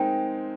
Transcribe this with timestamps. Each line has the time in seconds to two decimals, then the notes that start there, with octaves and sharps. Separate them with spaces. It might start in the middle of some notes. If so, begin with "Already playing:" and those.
Already playing: G#3 C4 D#4 A#4 G5